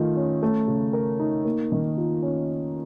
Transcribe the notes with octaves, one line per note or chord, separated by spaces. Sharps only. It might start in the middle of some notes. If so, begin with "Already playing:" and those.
Already playing: D#3 A3 F4
C#4
A3
C#3
A#4
D#4
A#3
D#3
F4
C#4